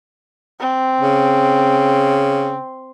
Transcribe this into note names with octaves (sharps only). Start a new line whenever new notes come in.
C4
C#3